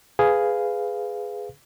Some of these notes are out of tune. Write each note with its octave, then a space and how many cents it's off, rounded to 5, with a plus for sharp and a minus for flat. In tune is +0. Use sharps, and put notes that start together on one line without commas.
G#4 +0 B4 +15 F5 +0